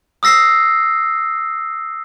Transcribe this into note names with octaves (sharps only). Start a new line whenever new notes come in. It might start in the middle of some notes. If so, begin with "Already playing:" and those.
D#6 E6 A#6 C7